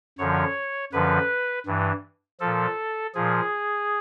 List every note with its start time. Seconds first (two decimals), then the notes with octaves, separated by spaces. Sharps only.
0.18 F#2 D3 F3 C#5
0.93 F#2 D3 F3 B4
1.66 G2 E3
2.40 A#2 F3 A4
3.15 A#2 F3 G#4